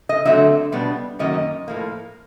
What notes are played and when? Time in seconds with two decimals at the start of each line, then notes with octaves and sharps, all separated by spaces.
0.09 D#5
0.25 D3 F#3 A3 C4 E5
0.72 B2 G3 B3 D4
1.19 F#2 D#3 F#3 A#3 C#4 D#5
1.68 A2 F3 A#3